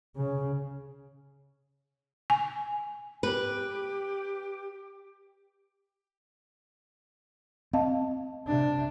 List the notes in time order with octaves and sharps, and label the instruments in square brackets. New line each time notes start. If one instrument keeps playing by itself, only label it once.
[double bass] C#3
[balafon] G#5
[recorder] G4 [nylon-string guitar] B4
[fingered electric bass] C4 [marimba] D#5 F5 A5
[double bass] C3 D4